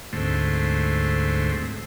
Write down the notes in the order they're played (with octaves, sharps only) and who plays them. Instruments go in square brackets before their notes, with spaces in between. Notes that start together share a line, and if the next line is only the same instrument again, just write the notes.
[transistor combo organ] D2 G#2 A3 C4